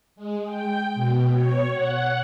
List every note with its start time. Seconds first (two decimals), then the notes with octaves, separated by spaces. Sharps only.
0.16 G#3
0.46 G5
0.95 B2
1.33 C#5
1.72 F#5